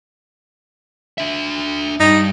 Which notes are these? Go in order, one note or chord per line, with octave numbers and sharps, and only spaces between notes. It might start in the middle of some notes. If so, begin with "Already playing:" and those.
D4 E5
G2 D#4